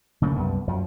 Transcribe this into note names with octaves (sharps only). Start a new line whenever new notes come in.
C#3 A3 A#3
C2 F#2 G3 B3
F#2 F3 F#3